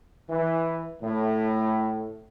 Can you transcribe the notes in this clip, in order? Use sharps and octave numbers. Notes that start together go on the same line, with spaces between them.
E3
A2